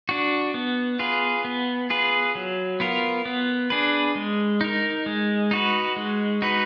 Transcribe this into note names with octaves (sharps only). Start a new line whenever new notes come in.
D4 F#4
B3
F4 G#4 B4
B3
F4 G#4 B4
F#3
B3 F4 A#4
B3
D4 G#4 B4
G#3
D#4 A#4
G#3
D#4 F#4 B4
G#3
D#4 F#4 B4